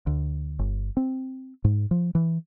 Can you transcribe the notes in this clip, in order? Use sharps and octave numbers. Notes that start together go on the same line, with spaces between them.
D2
G1
C4
G#2
F3
E3